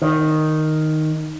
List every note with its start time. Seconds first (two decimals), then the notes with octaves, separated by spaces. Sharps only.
0.02 D#3